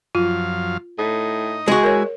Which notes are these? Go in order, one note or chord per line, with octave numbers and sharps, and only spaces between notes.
F#2 F3 F4 F5
A2 D#4 D#5
G#3 F#4 G#4
E4 A#4 C#5 G#5